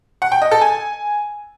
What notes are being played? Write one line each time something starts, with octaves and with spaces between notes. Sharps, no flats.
F#5
G5
D#5
A4
G#5